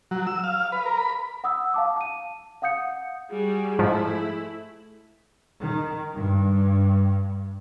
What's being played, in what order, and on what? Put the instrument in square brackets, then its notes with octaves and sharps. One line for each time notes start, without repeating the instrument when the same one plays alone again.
[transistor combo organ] F#3
E6
F5
B4
A#4
B5
[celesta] F#5 D#6 E6
F5 A5 D6
A5 D#7
F5 F#5 D#6 G6 C#7
[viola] G3 F#4 [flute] G#4
[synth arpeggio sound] G#2 F3 [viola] A3 E4
[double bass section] D#3
G2